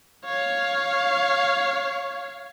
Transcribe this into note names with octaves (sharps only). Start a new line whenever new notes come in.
C#5 F5